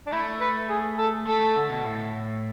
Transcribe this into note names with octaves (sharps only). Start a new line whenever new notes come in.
D4
A3 E4
B4
G#4
A4
A3 A4
A3
D3
B2
A2